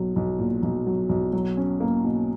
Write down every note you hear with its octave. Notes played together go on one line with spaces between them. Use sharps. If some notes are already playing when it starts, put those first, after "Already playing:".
Already playing: B1 F#3
B1
A#2
B1
F#3
B1
F#3
C#4
A#3
B2